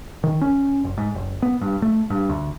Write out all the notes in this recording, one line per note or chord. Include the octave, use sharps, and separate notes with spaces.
D#3
C#4
F#1
G#2
F#1
B3
G2
A3
G2
D2